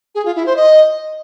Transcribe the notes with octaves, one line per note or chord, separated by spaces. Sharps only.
G#4
F4
E4
C5
D#5